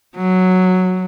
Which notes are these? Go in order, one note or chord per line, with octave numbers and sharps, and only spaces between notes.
F#3